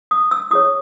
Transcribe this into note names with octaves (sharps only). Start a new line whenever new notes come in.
D#6
E6
E4 G#4 C#5 D#6